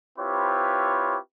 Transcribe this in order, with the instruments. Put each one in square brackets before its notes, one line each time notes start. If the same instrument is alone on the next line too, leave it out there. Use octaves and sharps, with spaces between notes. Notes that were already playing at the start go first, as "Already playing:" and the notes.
[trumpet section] C4 E4 F4 G4 B4 C#5